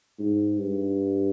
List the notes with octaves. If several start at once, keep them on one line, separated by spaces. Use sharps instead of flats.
G#2
G2